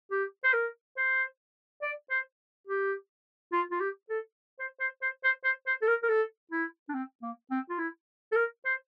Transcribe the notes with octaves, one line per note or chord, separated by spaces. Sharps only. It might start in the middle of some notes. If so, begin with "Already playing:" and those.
G4
C5
A#4
C5
D5
C5
G4
F4
F4
G4
A4
C5
C5
C5
C5
C5
C5
A4
A#4
A#4
A4
E4
D4
C4
A#3
C4
F4
E4
A4
A#4
C5